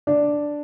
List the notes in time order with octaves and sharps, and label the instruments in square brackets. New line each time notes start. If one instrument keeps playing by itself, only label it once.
[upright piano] D3 D4 D5